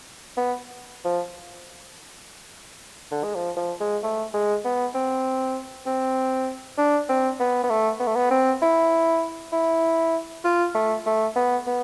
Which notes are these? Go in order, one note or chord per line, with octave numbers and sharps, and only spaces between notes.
B3
F3
D3
G#3
F3
F3
G#3
A3
G#3
B3
C4
C4
D4
C4
B3
B3
A3
B3
A3
B3
C4
E4
E4
F4
A3
A3
B3
B3